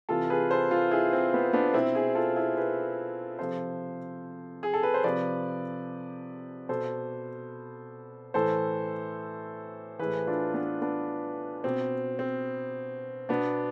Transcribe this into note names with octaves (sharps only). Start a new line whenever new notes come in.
C3 E3 F4 A4
G#4 B4
A4 C5
F4 A4
E4 G#4
C4
B3
B3 D4
B2 C4 E4
E4 G#4
F4 A4
E4 G#4
G#4 B4
C3 F3 A4 C5
G#4
A4
B4
C5
C3 F3 B4 D5
B2 A4 C5
A2 E3 A4 C5
A2 E3 G#4 B4
D4 F4
B3 D4
B3 D4
B2 C4
C4
B2 B3 D4